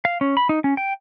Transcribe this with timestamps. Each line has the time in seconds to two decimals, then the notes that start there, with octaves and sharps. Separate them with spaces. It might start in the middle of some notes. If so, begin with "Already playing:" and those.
0.05 F5
0.21 C#4
0.37 B5
0.49 D#4
0.64 C#4
0.77 G5